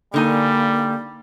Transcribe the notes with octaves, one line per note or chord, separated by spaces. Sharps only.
D3 G3 A#3 D#4 G#5